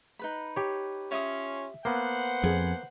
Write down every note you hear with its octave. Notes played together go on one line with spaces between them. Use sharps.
D#4 B4 B5
G4 C#5
C#4 F4 E5 D#6
A#3 B3 B4 C5 F#5
F2 G#4